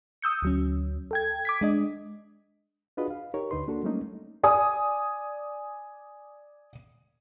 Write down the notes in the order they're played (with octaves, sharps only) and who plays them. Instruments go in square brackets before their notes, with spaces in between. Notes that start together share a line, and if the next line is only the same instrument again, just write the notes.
[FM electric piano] D#6 E6 G6 C#7
D2 F#3 C#4
A4 G5 G#6
D6 G#6 B6
G#3 D4 D#5
[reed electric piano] D4 F4 F#4 G#4 B4 D#5
F5
D#4 G4 A#4 C#5
D2 D3 D#4 B4 C6
A#3 D4 F#4 A4
F#3 G3 A3 A#3 C#4 D#4
[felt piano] D5 G#5 D#6